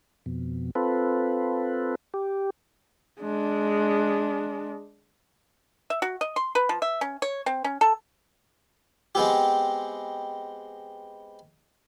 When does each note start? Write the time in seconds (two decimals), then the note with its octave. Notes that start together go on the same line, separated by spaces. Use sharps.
0.26 F2 B2
0.75 C4 F4 A4 B4
2.14 G4
3.21 G#3 D4
5.90 E5
6.02 F#4
6.21 D#5
6.36 C6
6.55 B4
6.69 F3
6.82 E5
7.01 C#4
7.22 C#5
7.46 C4
7.64 C#4
7.81 A4
9.15 G#3 B3 C4 G4